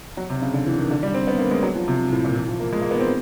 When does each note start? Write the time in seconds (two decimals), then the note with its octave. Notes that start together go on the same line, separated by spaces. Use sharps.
0.17 F#3
0.30 C3
0.42 C#3
0.53 D3
0.66 E3
0.79 D#3
0.91 D3
1.03 G3
1.14 C4
1.27 B3
1.38 A#3
1.51 G#3
1.63 F#3
1.75 F3
1.88 C3
2.12 A2
2.24 A#2
2.36 E3
2.48 F3
2.60 A#3
2.73 G#3
2.82 A#3
2.91 B3
3.00 C4